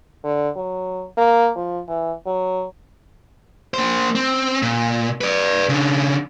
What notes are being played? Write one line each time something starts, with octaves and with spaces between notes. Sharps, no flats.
D3
F#3
A#3
F3
E3
F#3
A#3 C5
C4
A#2
B4 D5
C#3 D4